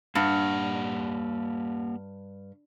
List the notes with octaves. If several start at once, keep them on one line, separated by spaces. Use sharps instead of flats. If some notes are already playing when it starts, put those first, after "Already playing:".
G2 A#3 G4 F#5